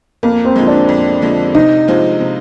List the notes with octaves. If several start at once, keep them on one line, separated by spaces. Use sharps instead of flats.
F2 A#3
C4
D3 F3 G#3
D4
F2
D3 F3 G#3
C3 D#4
F3 G#3 C4 F4
C3